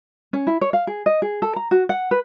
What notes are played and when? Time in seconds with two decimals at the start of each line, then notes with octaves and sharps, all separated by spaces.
0.33 C#4
0.47 E4
0.61 C#5
0.73 F5
0.87 G#4
1.06 D#5
1.22 G#4
1.42 A4
1.56 A#5
1.71 F#4
1.89 F#5
2.11 B4